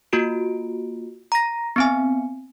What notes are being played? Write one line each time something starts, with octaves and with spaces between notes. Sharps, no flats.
A#3 F4 F#4 D7
A#5 A#6
B3 C4 G#5